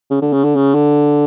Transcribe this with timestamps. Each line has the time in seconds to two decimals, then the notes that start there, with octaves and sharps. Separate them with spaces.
0.11 C#3
0.22 D3
0.33 C#3
0.44 D3
0.56 C#3
0.75 D3